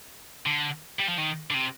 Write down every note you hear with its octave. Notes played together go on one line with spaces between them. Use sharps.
D3
G3
F3
D#3
D3
C3